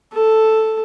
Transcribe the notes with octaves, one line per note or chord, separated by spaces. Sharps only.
A4